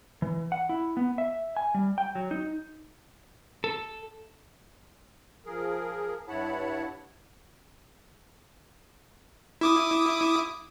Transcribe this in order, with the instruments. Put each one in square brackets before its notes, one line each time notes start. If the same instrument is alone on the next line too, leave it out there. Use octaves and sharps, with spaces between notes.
[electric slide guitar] E3
F#5
E4
B3
E5
G#5
G3
G5
F#3
D#4
A4
[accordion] F3 G#4 A#4
G2 E4 C#5 F#5 A5 B5
[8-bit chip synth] E4 D6 D#6